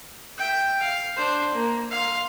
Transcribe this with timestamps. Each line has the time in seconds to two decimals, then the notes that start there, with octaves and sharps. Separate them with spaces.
0.38 E5 G5
0.80 F5
1.17 D4 C5
1.54 A#3
1.91 F5 C6